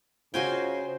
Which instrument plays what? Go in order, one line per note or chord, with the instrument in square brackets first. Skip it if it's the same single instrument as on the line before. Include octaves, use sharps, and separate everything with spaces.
[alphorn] C#3 [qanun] F4 F#4 D#5 [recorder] C5 [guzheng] G5 G#5 C6